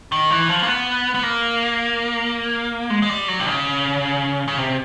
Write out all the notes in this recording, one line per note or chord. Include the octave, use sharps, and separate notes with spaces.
D#3
E3
F3
A#3
B3
B3
A#3
G#3
G#3
G3
F#3
C3
C#3
C#3
C3